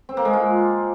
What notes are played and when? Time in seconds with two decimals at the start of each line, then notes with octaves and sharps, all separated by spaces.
0.09 C4
0.17 A#3
0.25 G#3
0.33 F4